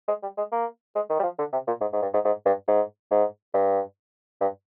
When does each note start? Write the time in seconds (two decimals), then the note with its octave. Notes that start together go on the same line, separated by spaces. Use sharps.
0.08 G#3
0.23 G3
0.37 G#3
0.52 A#3
0.95 G#3
1.10 D#3
1.19 G3
1.23 F3
1.39 D3
1.53 C3
1.67 A#2
1.81 G#2
1.93 G#2
2.02 G2
2.14 G#2
2.25 G#2
2.45 G2
2.68 G#2
3.11 G#2
3.54 G2
4.41 G2